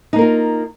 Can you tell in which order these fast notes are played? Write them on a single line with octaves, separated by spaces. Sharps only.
D#4 A#3 A#4 F4